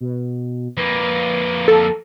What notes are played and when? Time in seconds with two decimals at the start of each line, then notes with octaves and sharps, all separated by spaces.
0.01 B2
0.77 F2 A#3 B4
1.68 A4